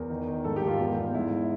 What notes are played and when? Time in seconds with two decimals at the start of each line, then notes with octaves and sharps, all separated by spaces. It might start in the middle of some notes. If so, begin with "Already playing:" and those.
Already playing: E2 A#4
0.10 D#3
0.27 D#3
0.44 G#2 A4
0.56 G4
0.62 G#2
0.68 F4
0.79 E2
0.97 E2
1.15 G#2 E4